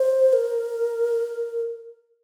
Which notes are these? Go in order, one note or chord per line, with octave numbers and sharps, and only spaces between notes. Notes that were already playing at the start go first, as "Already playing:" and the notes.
Already playing: C5
A#4